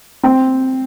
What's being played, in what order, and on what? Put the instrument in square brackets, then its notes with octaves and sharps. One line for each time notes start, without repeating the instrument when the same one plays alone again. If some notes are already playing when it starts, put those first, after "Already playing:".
[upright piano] C4 G5